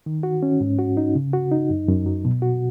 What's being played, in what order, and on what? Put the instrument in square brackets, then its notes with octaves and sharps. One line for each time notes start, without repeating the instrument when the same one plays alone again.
[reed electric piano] D#3
F#4
C#4
G#2
F#4
D#4
C#3
F#4
D#4
F#2
F#2
F#3
B2
F#4